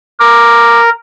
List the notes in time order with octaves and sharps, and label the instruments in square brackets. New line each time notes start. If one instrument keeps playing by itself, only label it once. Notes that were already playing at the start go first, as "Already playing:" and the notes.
[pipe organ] A#4 [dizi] D6